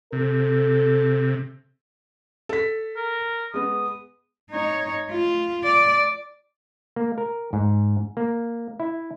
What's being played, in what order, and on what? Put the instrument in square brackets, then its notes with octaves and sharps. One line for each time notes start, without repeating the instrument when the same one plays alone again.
[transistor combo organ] C3 [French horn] A4
[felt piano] A4 B6
[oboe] A#4
[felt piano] G#3 B3 [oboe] D#6
[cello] D#4 C#5
F4
D5
[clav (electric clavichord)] A#3
A#4
G#2
A#3
E4